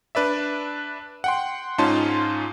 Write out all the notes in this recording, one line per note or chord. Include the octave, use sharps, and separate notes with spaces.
D4 B4 D5 E5
F#5 G5 C6
G#2 C#4 D#4 F4 A5 C6